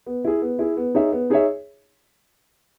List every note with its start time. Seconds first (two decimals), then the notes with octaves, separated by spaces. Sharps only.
0.06 B3
0.24 E4 G#4
0.42 B3
0.59 E4 G#4
0.77 B3
0.95 D#4 G#4 C#5 E5
1.12 B3
1.30 D#4 G#4 C#5 E5